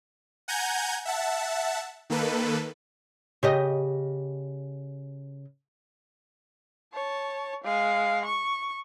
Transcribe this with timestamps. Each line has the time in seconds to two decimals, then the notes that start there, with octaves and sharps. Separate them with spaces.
0.48 F#5 G#5 A#5 G6 G#6
1.05 E5 F#5 A5
2.10 D#3 A#3 A4 B4
3.43 C#3 G4 D#5
6.94 C#5 A5
7.64 G#3 F5
8.25 C#6